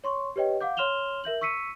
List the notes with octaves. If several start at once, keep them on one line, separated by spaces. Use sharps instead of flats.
C#5 C6 C#6
G4 B4 C#5 D#5 G5
F5 F#5 D6 G6
C#5 C6 F6 E7 F7 G7
A#4 E5 G6 F#7
C#6 E6 B6 C#7 D#7